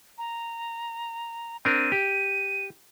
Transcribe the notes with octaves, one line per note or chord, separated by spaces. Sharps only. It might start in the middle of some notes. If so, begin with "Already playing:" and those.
A#5
C4 D4 A#4 D#7
G4